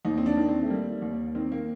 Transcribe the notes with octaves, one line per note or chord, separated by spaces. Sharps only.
D#2 D#4
C4
D4
D#3
C4
A3
G3 A#3
D#2
D#3 C4
A#3